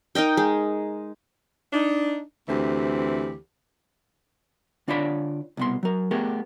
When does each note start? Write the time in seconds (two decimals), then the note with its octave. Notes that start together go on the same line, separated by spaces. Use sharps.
0.15 D#4 A#4 D#5 G5
0.37 G#3
1.73 D4 D#4
2.48 D2 E3 C4 G4
4.88 D3 D4 F4 C#5 D5 B5
5.57 C2 B2 C6
5.83 F#3 A#4
6.11 A3 B3 G4 G#4 A#4